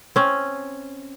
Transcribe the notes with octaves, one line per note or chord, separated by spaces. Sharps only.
C4 C#4